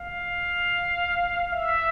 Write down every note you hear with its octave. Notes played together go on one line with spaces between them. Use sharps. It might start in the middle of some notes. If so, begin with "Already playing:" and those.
Already playing: F5
E5